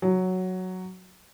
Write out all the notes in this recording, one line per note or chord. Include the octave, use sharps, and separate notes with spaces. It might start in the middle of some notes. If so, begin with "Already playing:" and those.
F#3